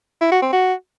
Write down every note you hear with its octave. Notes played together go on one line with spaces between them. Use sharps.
E4
F#4
C4
F#4